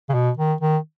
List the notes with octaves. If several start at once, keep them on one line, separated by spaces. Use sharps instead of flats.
C#3
B2
D#3
D#3